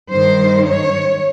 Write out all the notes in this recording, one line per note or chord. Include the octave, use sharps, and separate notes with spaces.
G2 D#3 C5
C#5